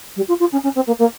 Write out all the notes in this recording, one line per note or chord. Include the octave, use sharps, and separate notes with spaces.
G3
F4
F4
C#4
C#4
C4
A#3
A#3